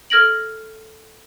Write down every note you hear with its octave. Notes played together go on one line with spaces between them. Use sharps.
A4 F6 G#6 A#6 D7 F#7